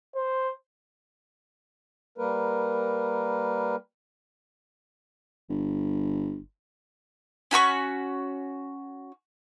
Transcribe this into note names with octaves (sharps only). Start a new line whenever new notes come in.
C5
G3 A#3 A#4 B4
G1
C#4 F#4 B5 C#6